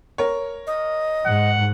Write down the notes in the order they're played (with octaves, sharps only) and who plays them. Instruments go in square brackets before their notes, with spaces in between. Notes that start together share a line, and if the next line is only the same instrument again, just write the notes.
[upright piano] A#4 C#5
[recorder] D#5
[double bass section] G#2 [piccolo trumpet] F#5